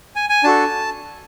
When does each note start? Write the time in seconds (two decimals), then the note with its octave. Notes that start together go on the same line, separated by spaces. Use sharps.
0.16 G#5
0.29 G#5
0.44 D4 F#4 A4 A5